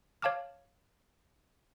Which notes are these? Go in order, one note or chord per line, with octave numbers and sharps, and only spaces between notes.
C#5 F5 A5 D6 F6